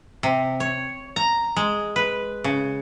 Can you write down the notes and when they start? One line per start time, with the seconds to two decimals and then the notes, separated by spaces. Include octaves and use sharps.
0.23 C3
0.60 C#5
1.16 A#5
1.56 G#3
1.96 B4
2.44 C#3